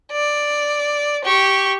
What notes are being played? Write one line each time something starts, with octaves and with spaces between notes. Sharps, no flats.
D5
G4 C#6